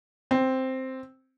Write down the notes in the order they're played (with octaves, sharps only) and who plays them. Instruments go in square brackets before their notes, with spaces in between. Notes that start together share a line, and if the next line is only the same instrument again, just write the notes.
[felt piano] C4